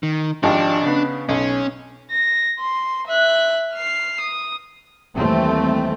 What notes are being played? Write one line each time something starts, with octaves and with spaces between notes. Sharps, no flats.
D#3
G#1 F3 D4 G4
C#3 B3
B1 C#4
A#6
C6
E5 F#6
F6 C7
D#6
D#2 E3 G3 A3 C4